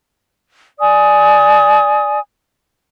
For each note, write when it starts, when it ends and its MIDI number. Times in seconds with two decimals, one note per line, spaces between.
0.78 2.18 74
0.78 2.18 80
0.78 2.18 87